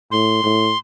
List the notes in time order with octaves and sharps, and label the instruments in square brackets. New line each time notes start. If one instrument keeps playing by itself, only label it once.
[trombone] A2 [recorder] C6
[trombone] A2